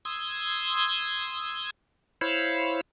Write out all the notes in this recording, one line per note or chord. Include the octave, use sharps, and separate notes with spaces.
C6 D#6 E6 G#6
E4 C5 C#5 F5 B5